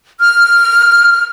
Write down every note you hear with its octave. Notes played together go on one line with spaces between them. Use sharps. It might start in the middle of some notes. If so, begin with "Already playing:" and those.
F6